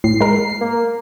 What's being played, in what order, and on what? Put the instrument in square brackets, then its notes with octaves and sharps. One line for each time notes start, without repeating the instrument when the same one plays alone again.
[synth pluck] A2 [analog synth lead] C7
[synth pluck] G#3 A#4
[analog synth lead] A#3